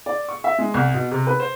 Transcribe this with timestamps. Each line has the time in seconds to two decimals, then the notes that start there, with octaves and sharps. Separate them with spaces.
0.06 D5
0.29 C#6
0.44 E5
0.59 G#3
0.74 C2
0.94 B2
1.11 C3
1.27 B4
1.40 C5